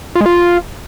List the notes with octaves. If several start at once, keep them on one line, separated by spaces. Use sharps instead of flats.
F4
G#3
F4